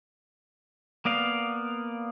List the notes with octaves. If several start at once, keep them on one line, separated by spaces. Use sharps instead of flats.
A#3 B3 D5 F5